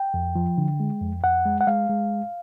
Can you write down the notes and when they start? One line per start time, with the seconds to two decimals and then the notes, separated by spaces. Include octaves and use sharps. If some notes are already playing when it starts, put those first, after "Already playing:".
Already playing: G5
0.14 F2
0.35 F3
0.58 D3
0.80 G#3
1.01 F2
1.24 F2 F#5
1.46 G#3
1.61 F#5
1.67 G#3 F5
1.90 G#3